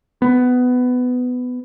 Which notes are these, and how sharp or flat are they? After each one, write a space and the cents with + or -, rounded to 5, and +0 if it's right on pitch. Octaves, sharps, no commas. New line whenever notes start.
B3 +15